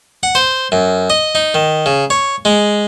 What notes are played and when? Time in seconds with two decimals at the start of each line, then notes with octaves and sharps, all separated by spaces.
0.23 F#5
0.35 C5
0.72 F#2
1.10 D#5
1.35 D#4
1.54 D#3
1.86 C#3
2.10 C#5
2.45 G#3